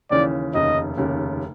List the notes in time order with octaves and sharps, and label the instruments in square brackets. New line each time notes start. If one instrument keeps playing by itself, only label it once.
[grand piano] D#2 C#3 E3 [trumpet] D5
[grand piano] F1 D#2 C#3 [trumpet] D#5
[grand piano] F1 D#2 C#3